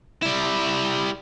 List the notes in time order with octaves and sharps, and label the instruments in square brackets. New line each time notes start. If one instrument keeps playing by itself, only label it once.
[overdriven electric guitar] G3 E4